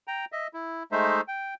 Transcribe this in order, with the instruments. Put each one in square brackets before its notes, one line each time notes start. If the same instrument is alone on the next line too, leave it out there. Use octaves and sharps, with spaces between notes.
[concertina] G5 A#5
D#5 E5
E4
G#3 A3 D#4 C5 E5
G5